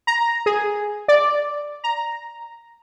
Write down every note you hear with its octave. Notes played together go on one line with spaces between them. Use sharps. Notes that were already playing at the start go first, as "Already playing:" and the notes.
A#5
G#4
D5
A#5